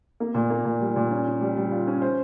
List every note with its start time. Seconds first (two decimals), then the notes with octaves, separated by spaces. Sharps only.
0.20 A#3
0.35 A#2
0.50 A#3
0.65 A#2
0.80 G3
0.96 A#2
1.11 C#4
1.27 C#4
1.41 G3
1.57 G3
1.72 F4
1.87 C#4
2.02 C5